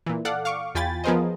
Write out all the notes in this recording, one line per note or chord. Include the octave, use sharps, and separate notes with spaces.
A#2 E3
A4 D5 F5 F#5
F5 C#6 D6
E2 F4 G5 G#5 B5 A6
F3 B3 G#4 A#4 C5 D#5